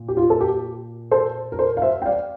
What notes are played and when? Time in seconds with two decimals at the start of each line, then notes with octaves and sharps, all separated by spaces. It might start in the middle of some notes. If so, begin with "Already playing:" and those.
Already playing: A#2
0.08 G4
0.17 F4
0.30 A4
0.41 G4
1.11 A4 C5
1.52 A#4
1.59 A4 C5
1.77 F5
1.82 C5 E5
2.02 G5
2.05 D5 F5